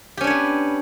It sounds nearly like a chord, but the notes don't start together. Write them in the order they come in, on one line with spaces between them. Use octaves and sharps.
G4 C#4 D4 C#5 B3